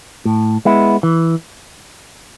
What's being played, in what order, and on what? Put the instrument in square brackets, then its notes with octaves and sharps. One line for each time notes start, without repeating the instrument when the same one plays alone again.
[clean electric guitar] A2
G#3 B3 E4
E3